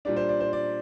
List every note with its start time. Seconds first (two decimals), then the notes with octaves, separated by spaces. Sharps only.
0.05 A#2 G3 D4 D5
0.17 C5
0.29 D5
0.40 C5
0.53 D5